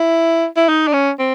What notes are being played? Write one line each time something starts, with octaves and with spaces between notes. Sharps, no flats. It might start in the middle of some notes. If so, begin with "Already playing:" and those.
Already playing: E4
E4
D#4
D4
C#4
C4